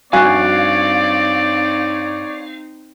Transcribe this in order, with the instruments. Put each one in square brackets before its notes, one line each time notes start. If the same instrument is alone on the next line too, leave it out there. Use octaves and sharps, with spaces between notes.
[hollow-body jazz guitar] G2 F#4 G#5 [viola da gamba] C4 D#4 [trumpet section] C#5 D5 [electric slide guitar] F5